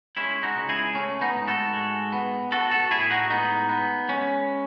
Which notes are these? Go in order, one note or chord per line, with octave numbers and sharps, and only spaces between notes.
G#3 C#4 E4
D#4 F#4
C#2
E4 G#4
A3 C#4
B3 D#4
G#2
F#4 A4
G#3
B3
B3 F#4 A4
F#4 A4
A2 E4 G#4
D#4 F#4
G#3 B3 D#4
B3
G#3 C#4